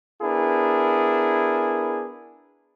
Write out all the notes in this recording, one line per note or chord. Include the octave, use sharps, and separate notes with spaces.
B3 D4 E4 G#4 A#4